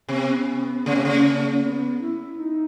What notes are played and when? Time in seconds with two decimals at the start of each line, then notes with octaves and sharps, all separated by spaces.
0.09 C3 B3
0.86 C#3 A#3
0.95 C3
1.05 C#3
1.63 B3
2.01 E4
2.39 D#4